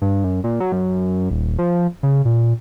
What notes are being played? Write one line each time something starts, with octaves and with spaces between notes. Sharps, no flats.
G2
F#2
A#2
F#3
F#2
D#1
F3
C#3
A#2